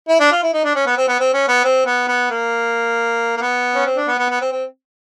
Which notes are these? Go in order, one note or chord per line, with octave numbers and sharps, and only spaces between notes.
E4
D4
F4
E4
D#4
D4
C#4
B3
C4
B3
C4
C#4
B3
C4
B3
B3
A#3
A#3
B3
C#4
C4
D4
B3
B3
B3
C4
C4